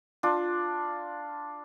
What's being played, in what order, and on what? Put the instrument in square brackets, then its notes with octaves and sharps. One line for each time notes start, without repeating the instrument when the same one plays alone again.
[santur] D4 F4